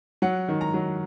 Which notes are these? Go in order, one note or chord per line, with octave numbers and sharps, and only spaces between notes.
F#3 F#5
D#3
A#5
F#3